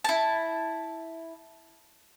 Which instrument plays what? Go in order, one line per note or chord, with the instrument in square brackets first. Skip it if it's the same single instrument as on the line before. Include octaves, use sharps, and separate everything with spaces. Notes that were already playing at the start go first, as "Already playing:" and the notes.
[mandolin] E4 A5